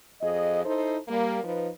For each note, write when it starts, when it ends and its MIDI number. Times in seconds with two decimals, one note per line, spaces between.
0.21 0.63 41
0.21 0.63 68
0.21 0.63 75
0.65 0.98 63
0.65 0.98 64
0.65 0.98 69
0.65 0.98 72
1.08 1.40 55
1.08 1.40 58
1.44 1.69 53
1.44 1.69 63
1.44 1.69 71